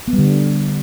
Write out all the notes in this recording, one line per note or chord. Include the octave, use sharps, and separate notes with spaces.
B3
G3
D3